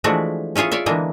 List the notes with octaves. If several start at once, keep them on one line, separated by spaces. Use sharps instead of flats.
E3 F3 G#3 A3 D4 F#4
C#4 E4 F4 G#4 C#5
F4 C#5 D5 E5
D3 E3 G#3 A#3 B3